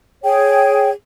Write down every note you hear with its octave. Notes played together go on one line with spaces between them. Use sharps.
G#4 C#5 G5